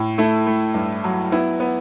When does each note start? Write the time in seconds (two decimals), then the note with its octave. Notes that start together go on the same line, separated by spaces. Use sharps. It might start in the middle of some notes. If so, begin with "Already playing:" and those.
Already playing: A2
0.18 A3 E4
0.47 A3
0.74 G2
1.04 F#3
1.32 B3 E4
1.60 B3